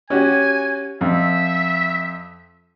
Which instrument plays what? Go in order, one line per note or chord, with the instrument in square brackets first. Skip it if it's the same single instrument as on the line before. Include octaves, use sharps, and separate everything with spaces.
[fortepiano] C#4 F#4 G4 [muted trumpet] G#5
[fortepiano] F2 [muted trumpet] E5